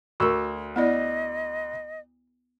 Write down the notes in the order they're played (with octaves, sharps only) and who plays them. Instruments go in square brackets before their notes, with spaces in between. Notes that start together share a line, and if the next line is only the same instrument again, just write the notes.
[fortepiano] D2 C#6 E6 [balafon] F#4 A#4
[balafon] B3 E4 D5 [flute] D#5